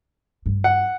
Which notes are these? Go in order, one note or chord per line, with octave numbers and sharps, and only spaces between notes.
G2
F#5